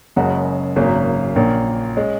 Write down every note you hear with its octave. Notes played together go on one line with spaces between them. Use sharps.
F#1 F#2 C#3 G#3 F#4
G#1 F#2 C#3 F#3 A#3
A#1 A#2 A#3 C#4
G#3 C#4